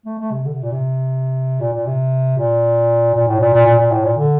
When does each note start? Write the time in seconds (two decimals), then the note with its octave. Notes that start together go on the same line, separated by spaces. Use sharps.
0.06 A3
0.19 A3
0.31 C3
0.45 D3
0.53 C3
0.62 A#2
0.72 C3
1.60 A#2
1.73 A#2
1.87 C3
2.38 A#2
3.15 A#2
3.28 A2
3.40 A#2
3.54 A#2
3.66 A#2
3.79 A#2
3.91 A2
4.05 A#2
4.18 D3